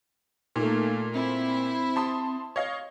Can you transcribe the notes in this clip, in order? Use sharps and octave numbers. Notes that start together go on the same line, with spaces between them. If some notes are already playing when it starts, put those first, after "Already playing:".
A#2 A3 A#3 D#4
C4 E4 C5
A5 C6 D#6
C#5 D#5 F5